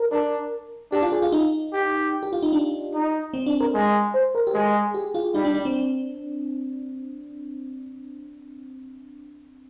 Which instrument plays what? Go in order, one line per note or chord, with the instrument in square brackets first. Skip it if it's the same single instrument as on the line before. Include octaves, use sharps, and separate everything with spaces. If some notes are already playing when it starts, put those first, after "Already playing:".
Already playing: [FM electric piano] A#4
[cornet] D4 [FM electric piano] A#4
[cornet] D4 [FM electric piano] G4
[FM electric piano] F4
G#4
F4
D#4
[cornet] G4
[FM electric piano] G4
F4
D#4
D4
[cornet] D#4
[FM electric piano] C4
D4
A#4
[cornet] G#3
[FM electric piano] C5
A#4
G4
[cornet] G#3 [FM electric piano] G#4
[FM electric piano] G4
F4
[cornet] G3 [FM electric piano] D#4
[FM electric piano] D4
D4
C4